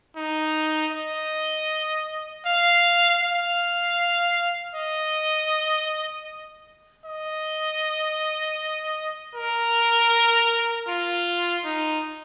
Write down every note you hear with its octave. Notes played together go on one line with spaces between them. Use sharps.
D#4
D#5
F5
F5
D#5
D#5
A#4
F4
D#4